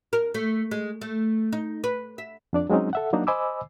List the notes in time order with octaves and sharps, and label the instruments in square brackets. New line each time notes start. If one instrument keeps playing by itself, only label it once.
[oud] A#4
A3
G#3
A3
D#4
B4
E5
[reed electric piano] F2 D4 D5
F#3 G#3 C4 C#4 D#4
A4 E5 F#5
F#3 A#3 D4 D#4 F#4
C5 D#5 G#5 B5 D6 E6